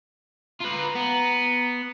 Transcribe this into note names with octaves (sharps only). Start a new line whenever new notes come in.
F4 B4 A#5
B3